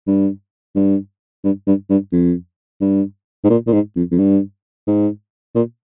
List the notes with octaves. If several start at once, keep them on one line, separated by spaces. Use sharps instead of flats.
G2
G2
G2
G2
G2
F2
G2
G#2
A#2
A#2
G#2
F2
F2
G2
G#2
A#2